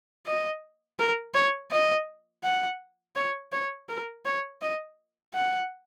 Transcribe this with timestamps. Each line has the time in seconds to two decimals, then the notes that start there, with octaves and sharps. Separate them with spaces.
0.26 D#5
0.99 A#4
1.34 C#5
1.71 D#5
2.43 F#5
3.16 C#5
3.52 C#5
3.89 A#4
4.25 C#5
4.61 D#5
5.34 F#5